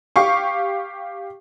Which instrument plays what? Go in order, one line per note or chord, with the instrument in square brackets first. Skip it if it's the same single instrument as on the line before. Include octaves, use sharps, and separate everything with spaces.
[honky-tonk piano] G4 F5 C#6